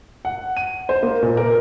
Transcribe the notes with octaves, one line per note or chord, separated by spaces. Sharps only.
F#5
D#7
C5
A#3
A#2
A#4